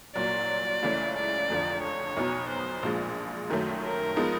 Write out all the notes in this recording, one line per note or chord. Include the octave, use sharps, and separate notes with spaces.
C2 A#2 F#3 D5
C#2 C#3 E3 A3 C#4
D5
F1 F2 D3 F3
C#5
B1 B2 F#3 B3 D#4
C5
A#1 A#2 F3 G#3
F#2 D#3 F#3 A3
A#4
F3 G#3 B3 D#4